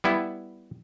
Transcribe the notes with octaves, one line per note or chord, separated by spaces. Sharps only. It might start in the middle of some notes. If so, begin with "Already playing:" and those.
G3 B3 E4